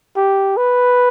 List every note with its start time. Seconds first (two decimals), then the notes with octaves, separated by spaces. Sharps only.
0.16 G4
0.57 B4